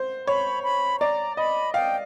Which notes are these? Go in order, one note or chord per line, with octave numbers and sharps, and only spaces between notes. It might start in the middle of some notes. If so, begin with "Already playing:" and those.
Already playing: C5
C#5 B5
B5
D5 A#5
D#5 B5
F5 G5